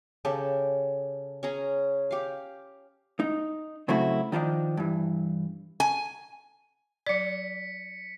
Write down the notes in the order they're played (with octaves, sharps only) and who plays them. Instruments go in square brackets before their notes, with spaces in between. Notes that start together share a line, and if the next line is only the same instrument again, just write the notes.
[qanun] C#3 G4 A4
C#4 G#4 A#5
G4 F5
[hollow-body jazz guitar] D#4
C#3 F#3 A3 C4 E4 F#4
D#3 F3 G3 D4 D#4
G2 E3
[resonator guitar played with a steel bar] G#5
[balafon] F#3 D5 [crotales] B6 C#7